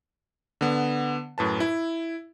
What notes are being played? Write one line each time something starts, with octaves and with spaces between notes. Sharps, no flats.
D3 B3
F#2 A2 B4 A5
E4